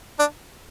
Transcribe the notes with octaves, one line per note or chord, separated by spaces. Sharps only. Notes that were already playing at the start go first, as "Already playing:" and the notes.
D4